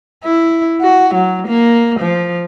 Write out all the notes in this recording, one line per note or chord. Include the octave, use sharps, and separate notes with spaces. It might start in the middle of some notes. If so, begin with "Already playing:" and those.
E4
F#4
F#3
A#3
F3